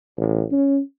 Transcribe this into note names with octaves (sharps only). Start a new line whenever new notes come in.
A1
C#4